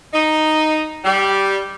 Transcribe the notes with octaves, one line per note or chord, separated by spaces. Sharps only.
D#4
G3